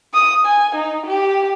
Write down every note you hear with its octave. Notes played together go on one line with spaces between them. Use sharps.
D#6
G#5
D#4
G4